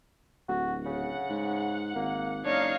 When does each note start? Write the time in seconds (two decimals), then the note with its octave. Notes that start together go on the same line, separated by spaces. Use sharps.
0.49 D1 F#4
0.86 C#3 F#5
1.30 G#2
1.96 G#1 A#3
2.45 F#1 D4 D#4 C#5 F5